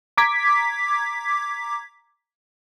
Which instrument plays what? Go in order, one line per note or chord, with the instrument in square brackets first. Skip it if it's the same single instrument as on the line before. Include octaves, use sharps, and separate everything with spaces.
[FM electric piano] A#5 D6 G#6 B6